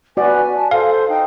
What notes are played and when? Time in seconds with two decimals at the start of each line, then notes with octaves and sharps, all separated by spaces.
0.17 F#4 B4 D5 G#5
0.54 A5
0.71 A4 C5 F5
1.09 D#4 G5